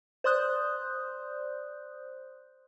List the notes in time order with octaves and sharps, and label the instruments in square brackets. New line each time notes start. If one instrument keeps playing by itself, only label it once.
[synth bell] C5 D5 C6 D#6 F#6 G6